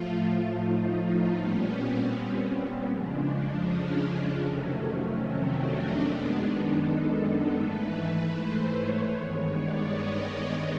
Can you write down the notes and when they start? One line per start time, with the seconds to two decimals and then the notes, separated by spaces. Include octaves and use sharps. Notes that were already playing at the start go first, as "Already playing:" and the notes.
Already playing: A2 F3 A3 F4
0.57 D#4
1.35 A#2 G3 B3 C#4
1.74 C4
2.13 C#4
2.52 C4
2.90 F2 C#3 F3 G#3 D4
3.68 C#4
4.07 C#4
4.46 F2 C3 D#3 F#3 A3
4.84 C#4
5.24 C4
5.62 D4
6.01 F#2 D#3 G#3 B3
6.40 D#4
6.79 A4
7.56 G#2 E3 A3 B4
8.34 C5
8.74 C#5
9.12 G2 D#3 G#3 B3 C#5
9.51 D5
9.90 D#5